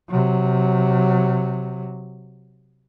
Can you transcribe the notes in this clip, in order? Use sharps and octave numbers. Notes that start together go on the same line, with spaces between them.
C3 F#3